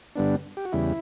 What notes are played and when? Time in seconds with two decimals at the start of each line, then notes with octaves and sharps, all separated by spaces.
0.15 G2 D3 G3 B3 D4
0.57 G4
0.65 F#4
0.72 E2 C#3 G3 E4